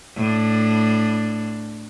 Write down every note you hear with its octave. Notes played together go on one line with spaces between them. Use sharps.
A2 D4